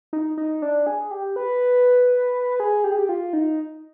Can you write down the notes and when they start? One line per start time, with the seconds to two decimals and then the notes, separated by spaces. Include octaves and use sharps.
0.13 D#4
0.37 D#4
0.62 D4
0.87 G#4
1.11 G4
1.36 B4
2.60 G#4
2.84 G4
2.91 G#4
2.99 G4
3.09 F4
3.33 D#4